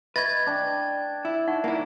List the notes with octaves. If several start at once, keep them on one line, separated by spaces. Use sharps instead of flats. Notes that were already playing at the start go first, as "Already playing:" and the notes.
B4 D#5 E5 C#6 G#6 A6
D4 G5
E4
D#4 F#5 C#6
A#3 E4